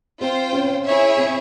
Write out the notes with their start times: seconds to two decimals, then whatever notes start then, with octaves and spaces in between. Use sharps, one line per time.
0.21 C4 F4 C5 G5
0.53 C#4
0.85 E4 G#4 C#5 E5
1.17 C4